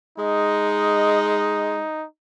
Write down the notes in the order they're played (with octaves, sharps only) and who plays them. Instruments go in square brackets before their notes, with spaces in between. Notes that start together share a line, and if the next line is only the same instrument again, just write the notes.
[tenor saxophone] G#3 [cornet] D#4